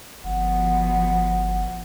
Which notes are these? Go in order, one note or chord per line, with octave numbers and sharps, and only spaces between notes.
G1 B2 F3 F#5